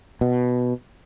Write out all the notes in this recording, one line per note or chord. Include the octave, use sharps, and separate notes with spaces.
B2